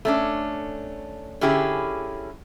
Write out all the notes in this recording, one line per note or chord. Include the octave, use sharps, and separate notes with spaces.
A3 C#4 D4
D3 C#4 E4 G4 G#4